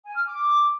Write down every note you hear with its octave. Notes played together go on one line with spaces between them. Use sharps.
G#5
F6
D6